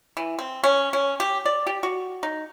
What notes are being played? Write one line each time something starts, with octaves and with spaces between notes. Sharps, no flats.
E3
C4
C#4
C#4
G4
D5
G4
F#4
D#4